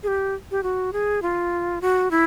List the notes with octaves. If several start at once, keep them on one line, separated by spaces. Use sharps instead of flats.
G#4
G4
G4
F#4
G#4
F4
F#4
E4